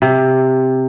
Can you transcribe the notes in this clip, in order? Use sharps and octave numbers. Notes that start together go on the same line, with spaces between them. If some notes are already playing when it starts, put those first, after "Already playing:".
C3